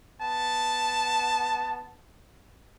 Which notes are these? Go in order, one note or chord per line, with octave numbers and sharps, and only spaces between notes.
B3 A5